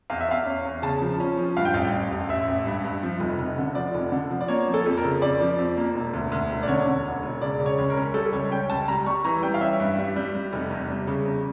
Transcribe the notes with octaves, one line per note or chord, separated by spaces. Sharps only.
E2 F5
E5
E2 F5
C#4
E2
C#3 A5
F3
C#4
F3
G2 F5
G5
A1 F5
A1
A1
A1 E5
A1
G2
G2
F3
F1
F1
D3
F3 D5
F1
D3
F3
D5
A#3 C#5
F3
A4
F2
A#4
C#3
F2 D5
F3
F2
A#3
E1
D2
D2
E1
D5
D3 C#5
D3
E1
E1
C#3 D5
C#3
C#5
C#2
A#4
C#4
G3 A4
C#2 C#5
C#4 G5
C#2 A5
G3 A#5
G3 C#6
E3 A#5
G3 G5
F5
C#4 E5
G2
G3
G3
G3
F1
E2
G3
C#3
E2